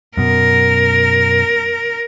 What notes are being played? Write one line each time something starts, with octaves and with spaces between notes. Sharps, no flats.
F#2 B2 A#4